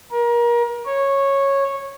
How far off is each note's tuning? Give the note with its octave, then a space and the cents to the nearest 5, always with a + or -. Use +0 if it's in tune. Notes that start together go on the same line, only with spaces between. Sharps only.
A#4 +30
C#5 -10